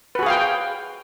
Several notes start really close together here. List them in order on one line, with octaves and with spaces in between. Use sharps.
B4 F#4 G#4 F5 G5